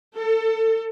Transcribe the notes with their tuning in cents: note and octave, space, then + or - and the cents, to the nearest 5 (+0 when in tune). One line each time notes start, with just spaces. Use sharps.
A4 +30